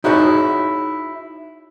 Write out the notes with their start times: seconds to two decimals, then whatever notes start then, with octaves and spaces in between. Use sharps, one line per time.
0.04 D#4 E4 F#4 G#4 C#5